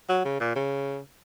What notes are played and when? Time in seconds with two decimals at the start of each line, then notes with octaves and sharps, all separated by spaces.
0.09 F#3
0.25 C#3
0.40 A#2
0.56 C#3